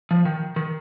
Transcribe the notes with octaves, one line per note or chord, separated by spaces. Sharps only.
F3
D#3
D#3